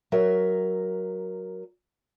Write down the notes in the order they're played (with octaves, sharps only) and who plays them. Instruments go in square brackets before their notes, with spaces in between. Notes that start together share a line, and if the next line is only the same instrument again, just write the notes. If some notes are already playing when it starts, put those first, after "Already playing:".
[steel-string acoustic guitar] F#3 A#4 E5